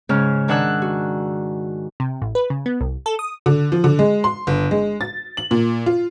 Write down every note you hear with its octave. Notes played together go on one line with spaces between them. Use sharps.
G#2 C#3 C#4 F6
D#3 D4 F#5 G#5 E6 F#6
F#4
C3
A1
B4
C#3
B3
C2
A4
D#6
D3
F3
D3
G#3
C6
G1
G#3
A6
F#7
A#2
F4